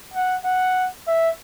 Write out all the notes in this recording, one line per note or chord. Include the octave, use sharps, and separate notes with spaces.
F#5
F#5
E5